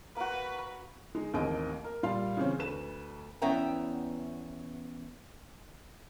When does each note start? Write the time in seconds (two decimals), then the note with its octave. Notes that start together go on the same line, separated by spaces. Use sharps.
0.16 A#3 F#4 B4
1.15 G#3 D#4
1.33 A1 D#2 A#3 C4 D#5 D7
1.84 A#4
2.03 A#2 G3 F4 F5 B5 C6
2.37 C#3 E3 C4 C#4
2.59 D2 B4 E7
3.42 E2 B3 C#4 E5 G5 A#5